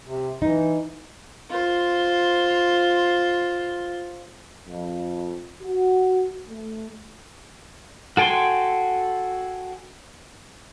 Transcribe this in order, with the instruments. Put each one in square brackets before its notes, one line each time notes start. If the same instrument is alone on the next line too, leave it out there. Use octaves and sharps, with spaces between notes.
[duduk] C3
[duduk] E3 [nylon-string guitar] D#4
[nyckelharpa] F4 C5
[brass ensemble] F2
F#4
A3
[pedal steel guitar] F#4 A4 G5 G#5 C6